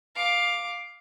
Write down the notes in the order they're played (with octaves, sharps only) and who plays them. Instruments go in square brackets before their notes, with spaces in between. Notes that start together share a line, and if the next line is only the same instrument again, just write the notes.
[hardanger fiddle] F5 D6